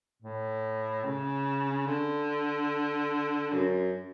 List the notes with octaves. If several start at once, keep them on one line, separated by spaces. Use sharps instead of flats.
A2
C#3
D3
F#2